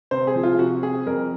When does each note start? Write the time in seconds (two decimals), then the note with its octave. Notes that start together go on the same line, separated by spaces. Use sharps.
0.11 C3 C5
0.27 G#4
0.35 F3
0.43 F4
0.59 C3 F#4
0.83 C4 G#4
1.06 F2 A#4